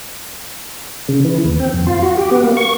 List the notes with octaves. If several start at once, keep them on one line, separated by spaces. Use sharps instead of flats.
C#3
E3
D#2
C4
F2
F4
F#4
G4
B3
A#3
C#6